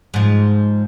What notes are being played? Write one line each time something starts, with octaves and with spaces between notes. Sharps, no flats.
G#2 F3